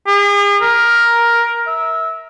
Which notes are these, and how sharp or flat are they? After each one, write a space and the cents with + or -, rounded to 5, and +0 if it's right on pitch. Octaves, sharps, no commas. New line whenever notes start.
G#4 -40
A#4 +10
E5 -20